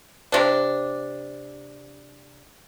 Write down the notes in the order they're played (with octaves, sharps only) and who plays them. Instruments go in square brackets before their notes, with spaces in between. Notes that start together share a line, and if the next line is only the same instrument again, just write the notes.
[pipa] C3 D4